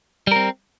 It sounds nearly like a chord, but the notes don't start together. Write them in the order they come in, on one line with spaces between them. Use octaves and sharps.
G3 A#4 C4